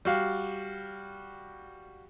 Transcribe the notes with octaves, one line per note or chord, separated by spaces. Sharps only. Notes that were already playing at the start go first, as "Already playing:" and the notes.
G3 F#4 F5